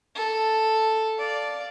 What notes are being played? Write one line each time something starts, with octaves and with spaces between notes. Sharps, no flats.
A4
D5 F5